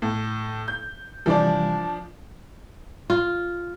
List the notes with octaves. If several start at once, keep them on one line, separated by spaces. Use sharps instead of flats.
A2
G6
C3 E3 F3 G3 D4 D5
F4